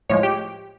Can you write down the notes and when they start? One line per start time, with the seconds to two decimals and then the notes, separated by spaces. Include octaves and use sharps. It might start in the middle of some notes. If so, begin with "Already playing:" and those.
0.10 A2 F3 G#3 C#5
0.23 G4